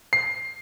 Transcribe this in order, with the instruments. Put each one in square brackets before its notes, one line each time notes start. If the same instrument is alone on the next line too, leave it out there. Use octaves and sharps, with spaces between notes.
[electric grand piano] C7